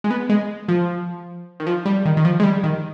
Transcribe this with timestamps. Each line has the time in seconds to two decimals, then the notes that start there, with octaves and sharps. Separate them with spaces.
0.04 G#3
0.11 B3
0.29 G#3
0.68 F3
1.60 D#3
1.67 F3
1.86 G3
2.05 D#3
2.17 D#3
2.25 F3
2.40 G#3
2.43 G3
2.64 D#3